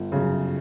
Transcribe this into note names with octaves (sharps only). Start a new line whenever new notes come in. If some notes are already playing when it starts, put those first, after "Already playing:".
Already playing: G1
F#2 C#3